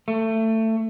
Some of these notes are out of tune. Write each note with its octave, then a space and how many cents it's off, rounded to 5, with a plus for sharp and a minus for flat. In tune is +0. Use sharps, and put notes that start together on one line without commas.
A3 +20